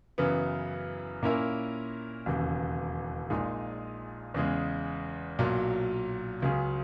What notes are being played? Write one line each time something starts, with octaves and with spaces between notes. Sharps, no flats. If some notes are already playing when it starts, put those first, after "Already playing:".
F#2 C#3 E3 B3
A#2 A#3 C#4 E4 A#4
E1 D#2 C#3 E3
A#1 A#2 G#3 D#4 G#4
E2 C#3 G#3
B1 A#2 F#3
C#2 C#3 F#3 C#4 G#4